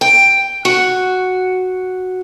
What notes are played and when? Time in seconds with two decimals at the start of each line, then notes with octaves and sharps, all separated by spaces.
0.01 G5
0.65 F#4